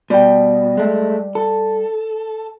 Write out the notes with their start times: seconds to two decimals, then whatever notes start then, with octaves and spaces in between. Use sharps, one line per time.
0.10 B2 G3 G5
0.77 G#3 A3
1.35 A4